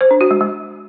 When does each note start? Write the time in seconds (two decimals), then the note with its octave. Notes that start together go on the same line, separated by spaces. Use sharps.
0.01 C5
0.11 D4
0.21 F#4
0.31 G#3
0.41 G#3